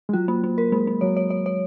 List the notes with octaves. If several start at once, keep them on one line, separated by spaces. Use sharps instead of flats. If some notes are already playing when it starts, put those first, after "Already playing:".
G#3
F#3 F4
A#3
A#3
A#4
G#3 A#3
A#3
F#3 C#5
C#5
C#5
C#5